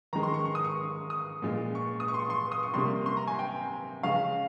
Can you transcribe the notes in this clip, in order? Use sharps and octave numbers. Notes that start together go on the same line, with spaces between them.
D#3 G#3 A#5
C6
C#6
C#6
D#6
C#6
D#6
A#2 G#3
C#6
D#6
C#6
C6
C#6
C6
D#6
C#6
C3 G3 A#3 C6
C6
A#5
G#5
G5
C#3 G#3 F5